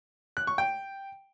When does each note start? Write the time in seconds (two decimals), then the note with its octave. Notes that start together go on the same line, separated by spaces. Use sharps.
0.37 F#6
0.47 C#6
0.58 G5